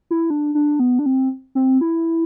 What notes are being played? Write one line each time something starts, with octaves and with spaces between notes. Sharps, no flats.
E4
D4
D4
B3
D4
C4
C4
E4